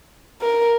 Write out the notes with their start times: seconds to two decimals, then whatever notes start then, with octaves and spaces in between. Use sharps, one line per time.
0.42 A#4